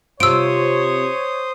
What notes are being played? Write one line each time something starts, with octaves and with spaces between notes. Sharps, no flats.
C3 F4 C5 C#5 D#6 E6 D7